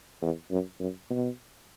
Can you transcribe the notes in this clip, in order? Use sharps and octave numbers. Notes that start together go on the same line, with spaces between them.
E2
F#2
F#2
B2